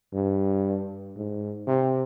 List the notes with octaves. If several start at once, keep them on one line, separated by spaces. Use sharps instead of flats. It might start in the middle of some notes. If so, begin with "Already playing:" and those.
G2
G#2
C3